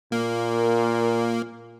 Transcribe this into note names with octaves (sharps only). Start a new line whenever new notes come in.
A#2 A#3